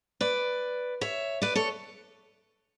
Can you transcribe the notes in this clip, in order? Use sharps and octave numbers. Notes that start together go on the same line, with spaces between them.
B4 D5
C#5 E5
B4 D5
A4 C#5